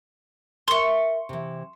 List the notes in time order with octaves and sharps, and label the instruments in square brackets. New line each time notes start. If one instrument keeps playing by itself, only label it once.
[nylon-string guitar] A#4 E5 [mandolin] C6 C#6
[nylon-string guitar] C3 E3